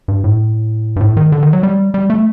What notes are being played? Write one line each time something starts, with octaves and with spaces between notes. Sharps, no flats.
G2
A2
G2
A2
D#3
D3
D#3
F#3
G3
G3
A3